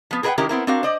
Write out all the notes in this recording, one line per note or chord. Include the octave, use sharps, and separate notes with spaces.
F3 B3
G#4 A#4 B4 D#5 F#5 G5
D#3 G#3 C#4 E4 G4 A#4
B3 C4 E4 A#4
C4 D4 F#4 A#4 F5
C5 D5 D#5